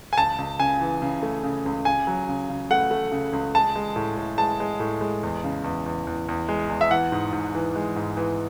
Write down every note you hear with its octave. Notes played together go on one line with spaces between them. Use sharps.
G#5
C#2 A5
C#2
C#3 G#5
E3
C#3
A3
C#3
C#2
C#3 G#5
F#3
C#3
C#3
A3 F#5
A3
C#3
C#2
G#3 A5
G#3
A2
A2
G#3 A5
G#3
A2
G#3
E2
C#3
E2
E2
E2
E2
G#3
E2
E5
E3 F#5
G#2
G#2
E3
G#3
G#2
E3